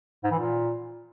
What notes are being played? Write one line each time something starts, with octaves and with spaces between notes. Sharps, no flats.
G#2
E3
A#2